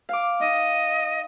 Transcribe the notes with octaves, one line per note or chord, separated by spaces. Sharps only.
F5 D6
D#4 D#5